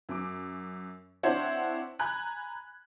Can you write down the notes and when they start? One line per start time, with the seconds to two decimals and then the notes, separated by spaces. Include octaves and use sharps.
0.09 F#2 D6
1.23 C4 D4 E4 C5 C#5 F#5
1.99 G#5 A#5 B5 F#6 G#6